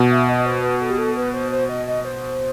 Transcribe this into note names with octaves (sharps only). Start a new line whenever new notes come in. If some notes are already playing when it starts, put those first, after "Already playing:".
Already playing: B2
E5
D#5
C5
B4
A4
G4
A4
B4
C5
C5
D#5
D#5
C5